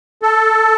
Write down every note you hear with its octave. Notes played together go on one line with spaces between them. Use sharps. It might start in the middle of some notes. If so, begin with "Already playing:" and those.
A4